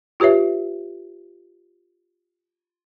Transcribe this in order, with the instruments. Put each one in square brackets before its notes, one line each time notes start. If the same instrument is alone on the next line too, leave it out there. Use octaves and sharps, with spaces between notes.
[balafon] F4 G4 B4 C#5 E5